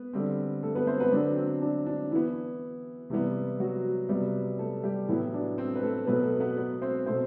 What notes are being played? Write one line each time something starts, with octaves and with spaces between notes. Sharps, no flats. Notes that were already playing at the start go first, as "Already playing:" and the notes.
Already playing: B3 B4
D3 G3 C4
A3 A4
B3 B4
C4 C5
B3 B4
D3 F#3 C4 D4
C4
D4
D4
E3 B3 E4
C3 E3 G3 B3
F#3 F#4
C3 G3 B3
A3 A4
G3 G4
A2 E3 F#3 B3 E4
D4
C4
B4
A3 A4
B2 F#3 A3 B3 B4
A3 A4
B3 B4
B3 B4
C4 C5
B2 A3 C4 C5